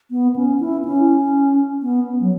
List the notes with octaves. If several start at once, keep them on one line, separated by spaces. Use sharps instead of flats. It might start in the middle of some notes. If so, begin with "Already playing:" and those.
B3
C#4
E4
C#4
B3
F#3